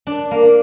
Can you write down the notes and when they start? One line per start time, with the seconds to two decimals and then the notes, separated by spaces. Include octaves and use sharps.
0.07 D4
0.31 A#3